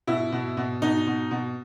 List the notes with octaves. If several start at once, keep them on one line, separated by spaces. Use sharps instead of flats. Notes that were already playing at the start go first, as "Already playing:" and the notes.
B2 E4
B2
B2
B2 D#4
B2
B2